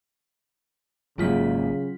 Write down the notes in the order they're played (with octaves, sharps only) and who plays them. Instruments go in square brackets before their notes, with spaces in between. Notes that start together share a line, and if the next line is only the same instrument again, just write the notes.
[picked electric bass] G#1 G#3 A#3 [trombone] C#3 [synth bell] F#3 F4 B6